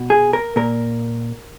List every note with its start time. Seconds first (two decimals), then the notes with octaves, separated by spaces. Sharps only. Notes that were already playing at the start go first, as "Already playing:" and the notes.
Already playing: B2
0.10 G#4
0.33 A#4
0.56 A#2 A#4